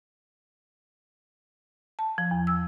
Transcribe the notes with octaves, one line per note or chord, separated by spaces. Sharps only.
A5
F3
E2
E6